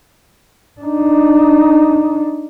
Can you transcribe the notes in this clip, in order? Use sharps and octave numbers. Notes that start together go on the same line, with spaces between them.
D4 D#4